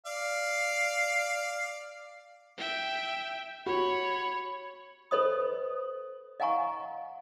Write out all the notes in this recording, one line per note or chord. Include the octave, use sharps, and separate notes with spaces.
D5 F5
E5 G5
F#4 C#5 B5
A4 B4 C5 D#5 B5 D#6
D#5 F5 F#5 G#5 A#5 C#6